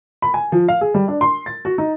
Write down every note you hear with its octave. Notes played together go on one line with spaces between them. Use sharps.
B5
G#5
F3
F5
G#4
G3
D4
C6
A6
F#4
D#4